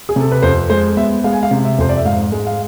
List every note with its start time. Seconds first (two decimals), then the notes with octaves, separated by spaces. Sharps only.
0.09 G#4
0.16 C3 A4
0.32 B4
0.43 F2 C5
0.70 G#3 C5
0.97 B3 E5
1.24 G#3 F5
1.33 G#5
1.43 F5
1.51 C3
1.65 E5
1.78 F2 C5
1.89 D5
1.97 E5
2.05 G#2 F5
2.32 G#3
2.47 F5